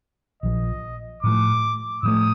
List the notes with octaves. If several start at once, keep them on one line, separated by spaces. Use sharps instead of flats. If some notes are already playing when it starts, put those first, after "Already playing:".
A#1 A#2 F3 D#5
A2 F3 A3 D6
A2 F3 A3 D#6